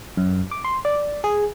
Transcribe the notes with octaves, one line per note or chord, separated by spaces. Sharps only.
F#2
D6
C6
D5
G#4